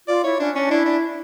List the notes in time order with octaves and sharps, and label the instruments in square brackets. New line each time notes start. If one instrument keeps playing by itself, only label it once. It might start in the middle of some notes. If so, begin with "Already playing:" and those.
[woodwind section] F4 [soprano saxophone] D5
[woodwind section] E4 [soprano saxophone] C#5
[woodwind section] C#4 [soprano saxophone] D4
[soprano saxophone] C#4 [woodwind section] D4
[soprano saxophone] D4 [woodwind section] E4
[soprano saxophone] D4